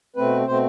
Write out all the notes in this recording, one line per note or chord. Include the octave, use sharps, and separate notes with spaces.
B2 A3 C4 B4
B2 A3 C4 C5